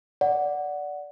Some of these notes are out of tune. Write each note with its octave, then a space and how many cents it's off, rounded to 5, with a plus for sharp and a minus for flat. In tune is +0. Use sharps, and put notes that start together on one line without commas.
D5 -10 F#5 +0